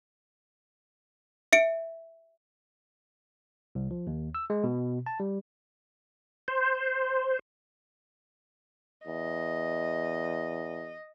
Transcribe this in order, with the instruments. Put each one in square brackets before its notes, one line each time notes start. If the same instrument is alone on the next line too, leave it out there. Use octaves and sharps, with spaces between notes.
[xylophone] E5 C#7 D7
[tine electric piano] C2
F3
D#2
E6
G#3
B2
A5
G3
[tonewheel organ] C5
[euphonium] E2 [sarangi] D#5